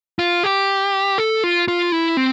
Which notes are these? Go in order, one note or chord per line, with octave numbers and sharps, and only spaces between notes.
F4
G4
A4
F4
F4
E4
C4